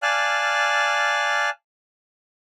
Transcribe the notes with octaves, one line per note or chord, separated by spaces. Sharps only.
D5 F5 G#5 A5 F6 F#6